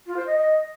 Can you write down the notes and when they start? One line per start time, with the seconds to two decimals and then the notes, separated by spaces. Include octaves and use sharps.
0.06 F4
0.16 C5
0.26 D#5
0.36 D#5